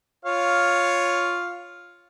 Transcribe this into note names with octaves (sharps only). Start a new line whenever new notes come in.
F4 C#5 F5